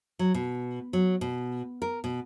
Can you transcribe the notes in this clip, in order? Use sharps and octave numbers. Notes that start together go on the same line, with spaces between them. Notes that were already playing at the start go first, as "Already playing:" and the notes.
F#3
B2
F#3
B2
A#4
B2